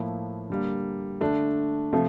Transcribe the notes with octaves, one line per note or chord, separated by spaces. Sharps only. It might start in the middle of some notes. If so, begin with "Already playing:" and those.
Already playing: A2 F3 A#3 E4
D3 G3 A#3
D3 A3 D4
C3 F3 A3